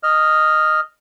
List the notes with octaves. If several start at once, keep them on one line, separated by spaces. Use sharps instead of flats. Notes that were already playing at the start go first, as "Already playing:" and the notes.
D#5 F6